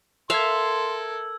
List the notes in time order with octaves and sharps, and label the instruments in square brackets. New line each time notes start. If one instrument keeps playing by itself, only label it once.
[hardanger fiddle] A4 A#4 [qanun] E5 F5 [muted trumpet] C6 [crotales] E6 G#6